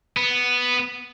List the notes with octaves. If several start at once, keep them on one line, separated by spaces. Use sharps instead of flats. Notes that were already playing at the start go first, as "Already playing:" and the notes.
B3